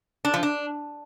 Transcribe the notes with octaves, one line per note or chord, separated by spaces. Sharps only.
D4
F3
D4